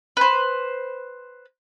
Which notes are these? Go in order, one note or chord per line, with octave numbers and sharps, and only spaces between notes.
B4 C5